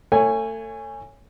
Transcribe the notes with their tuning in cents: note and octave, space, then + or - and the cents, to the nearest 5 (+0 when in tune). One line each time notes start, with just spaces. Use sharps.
A3 +35 C#5 +0 G#5 -10